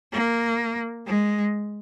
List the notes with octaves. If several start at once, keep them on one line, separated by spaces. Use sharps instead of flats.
A#3
G#3